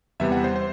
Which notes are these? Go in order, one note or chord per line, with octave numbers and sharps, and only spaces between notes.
E2 C3 G3 B3 E5
F#5
C5
C5